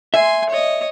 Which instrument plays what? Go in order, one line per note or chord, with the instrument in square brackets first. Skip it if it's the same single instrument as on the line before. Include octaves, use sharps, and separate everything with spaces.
[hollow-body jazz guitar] E5 [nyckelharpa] G#5 C6
[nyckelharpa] C#5 D#5